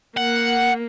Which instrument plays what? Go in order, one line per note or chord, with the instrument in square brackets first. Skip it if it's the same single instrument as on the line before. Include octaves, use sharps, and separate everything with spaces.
[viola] A#3 [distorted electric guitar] F#5